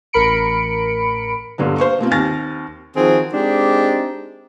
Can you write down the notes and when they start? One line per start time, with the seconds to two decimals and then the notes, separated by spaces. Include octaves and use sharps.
0.13 A1 A#4 B5 C#7 D7
1.58 G2 A#2 D3 F#3 B3
1.78 C5 F5 C#6
1.99 B2 A#3 C4 F4
2.11 D#2 C4 G#5 F6 A6 A#6
2.96 D#3 F3 C4 F#4 G#4
3.33 G#3 C4 D4 D#4 G4